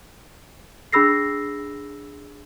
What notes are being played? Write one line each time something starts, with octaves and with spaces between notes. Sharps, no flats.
D4 G#4 B5 E6 A#6 C7